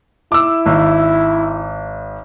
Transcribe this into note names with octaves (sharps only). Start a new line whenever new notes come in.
E4 D6 E6
G#1